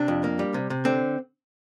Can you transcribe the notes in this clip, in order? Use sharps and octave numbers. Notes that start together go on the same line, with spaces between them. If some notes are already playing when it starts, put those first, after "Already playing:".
Already playing: C3 D4
F2
A#3
G3
C3
C3
D3 C4